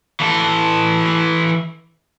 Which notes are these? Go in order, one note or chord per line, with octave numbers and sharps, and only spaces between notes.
E3 A4